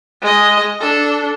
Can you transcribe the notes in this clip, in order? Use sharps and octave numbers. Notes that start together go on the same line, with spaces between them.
G#3 D#5
D4 A4